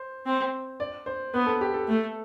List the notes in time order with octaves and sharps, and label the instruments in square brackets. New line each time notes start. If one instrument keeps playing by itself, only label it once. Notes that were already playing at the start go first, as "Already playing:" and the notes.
Already playing: [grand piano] C5
[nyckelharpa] C4
[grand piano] D5
C5
[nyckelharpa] B3 [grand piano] B4
[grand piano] A4
G4
A4
[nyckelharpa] A3